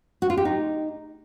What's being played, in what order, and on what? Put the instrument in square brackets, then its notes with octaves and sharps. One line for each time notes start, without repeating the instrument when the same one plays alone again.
[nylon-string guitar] F#4
F4
G4
D#4